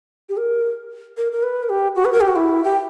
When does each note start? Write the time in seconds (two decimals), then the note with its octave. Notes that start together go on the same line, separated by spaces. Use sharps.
0.29 G4
0.37 A#4
1.17 A#4
1.32 A#4
1.43 B4
1.63 A#4
1.69 G4
1.96 F#4
2.05 B4
2.12 A#4
2.21 G4
2.28 F#4
2.36 E4
2.64 G4